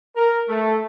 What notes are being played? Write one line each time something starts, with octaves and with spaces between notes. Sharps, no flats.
A#4
A3